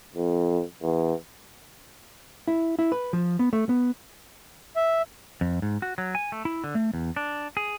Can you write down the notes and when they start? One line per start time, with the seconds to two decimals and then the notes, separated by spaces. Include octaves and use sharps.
0.15 F2
0.82 E2
2.48 E4
2.79 E4
2.92 B4
3.13 F3
3.39 B3
3.53 A3
3.69 B3
4.76 E5
5.41 F2
5.62 G#2
5.82 F#4
5.98 F#3
6.15 G#5
6.32 A3
6.45 E4
6.64 D3
6.75 A3
6.94 E2
7.16 D4
7.57 G#4